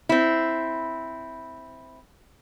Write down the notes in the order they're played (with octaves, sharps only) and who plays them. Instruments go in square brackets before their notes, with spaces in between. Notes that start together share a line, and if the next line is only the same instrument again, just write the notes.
[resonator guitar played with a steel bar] C4 E4